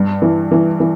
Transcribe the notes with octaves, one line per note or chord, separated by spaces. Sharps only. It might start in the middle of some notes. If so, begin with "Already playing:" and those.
Already playing: G2
E3
E3
E3